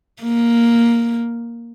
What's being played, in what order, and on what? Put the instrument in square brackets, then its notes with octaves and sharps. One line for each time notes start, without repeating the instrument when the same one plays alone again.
[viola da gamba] A#3